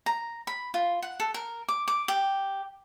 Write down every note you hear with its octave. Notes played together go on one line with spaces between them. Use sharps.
A#5
B5
F4
F#5
A4
A#4
D6
D6
G4